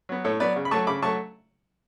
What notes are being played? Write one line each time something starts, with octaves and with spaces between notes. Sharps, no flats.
F#3 B3
A2 A4 C#5
F#3 B3 B4 D5
C#3
B5
F#3 A3 A5 C#6
C#3 B5 D6
F#3 A3 A5 C#6